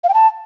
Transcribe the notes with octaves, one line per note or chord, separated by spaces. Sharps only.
F5
G5
A5